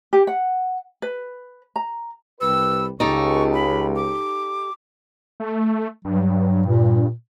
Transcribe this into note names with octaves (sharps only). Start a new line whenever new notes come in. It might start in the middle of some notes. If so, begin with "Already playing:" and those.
G4
F#5
B4
A#5
C2 G4 B4 E6
C#2 D#4 G4 A4 C#6
B5
D6
A3
G2 F#3
A#2